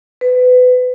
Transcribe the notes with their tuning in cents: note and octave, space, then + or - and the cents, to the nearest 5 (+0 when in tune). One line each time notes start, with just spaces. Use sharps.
B4 +25